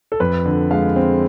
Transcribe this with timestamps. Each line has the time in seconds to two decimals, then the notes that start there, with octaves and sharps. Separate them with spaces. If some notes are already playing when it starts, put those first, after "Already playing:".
0.12 A4
0.20 F2 B4
0.46 D3
0.71 G#3 F5
0.96 C4